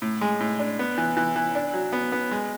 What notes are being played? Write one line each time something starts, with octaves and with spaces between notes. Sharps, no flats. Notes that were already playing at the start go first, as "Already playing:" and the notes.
A2
G#3
A2
D4
B3
E3
E3
E3
D4
F#3
B3
B3
G#3